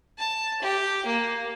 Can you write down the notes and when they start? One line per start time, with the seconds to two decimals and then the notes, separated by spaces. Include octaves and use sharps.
0.18 A5
0.62 G4
1.06 A#3